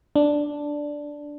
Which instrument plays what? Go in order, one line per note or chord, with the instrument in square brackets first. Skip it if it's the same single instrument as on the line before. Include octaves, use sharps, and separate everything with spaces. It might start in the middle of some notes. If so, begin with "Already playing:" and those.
[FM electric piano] D4